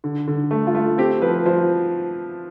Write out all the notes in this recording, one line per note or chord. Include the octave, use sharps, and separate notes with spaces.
D3
D3
A3
F4
A3
C4 G4
F3 B4
F3 C5